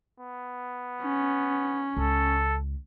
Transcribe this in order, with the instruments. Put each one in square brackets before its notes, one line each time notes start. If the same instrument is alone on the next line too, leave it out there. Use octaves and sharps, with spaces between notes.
[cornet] B3
[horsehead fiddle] C#4
[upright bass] C#2 [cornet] A4